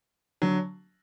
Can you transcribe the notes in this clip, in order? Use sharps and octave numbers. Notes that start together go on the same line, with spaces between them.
D3 F#3